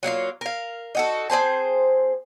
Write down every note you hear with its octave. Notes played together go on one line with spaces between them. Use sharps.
F#3 A#3 D#4 F4
A#4 F5
D#4 F#4 A4
C4 G#4 C5 A5